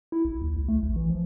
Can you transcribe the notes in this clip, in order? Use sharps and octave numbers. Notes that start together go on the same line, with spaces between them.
E4
B1
D#2
C#2
A3
A#1
E3
F3